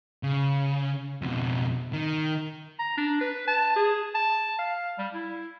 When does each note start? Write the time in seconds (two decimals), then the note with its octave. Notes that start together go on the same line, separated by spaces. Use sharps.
0.23 C#3
1.22 F2 B2
1.93 D#3
2.79 A#5
2.97 D4
3.21 B4
3.47 A5
3.76 G#4
4.15 A5
4.58 F5
4.98 G3
5.14 E4